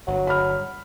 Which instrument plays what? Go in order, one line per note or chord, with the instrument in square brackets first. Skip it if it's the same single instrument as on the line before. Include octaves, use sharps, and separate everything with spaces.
[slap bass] G1 [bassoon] F#3
[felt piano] B5 F6